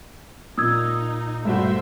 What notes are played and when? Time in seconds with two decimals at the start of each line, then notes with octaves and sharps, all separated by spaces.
0.58 A#2 D#4 D#6 E6 G#6
1.45 G2 A3 F#4 C5 E5